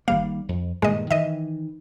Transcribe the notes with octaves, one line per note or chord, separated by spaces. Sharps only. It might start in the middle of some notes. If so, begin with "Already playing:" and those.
G1 D#3 G3 A#3 F5
F2
G2 A#2 D#3 G#3 D#5
D#3 E3 D#5 E5